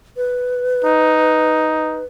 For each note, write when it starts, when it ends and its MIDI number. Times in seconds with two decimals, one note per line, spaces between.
0.17 2.05 71
0.85 2.03 63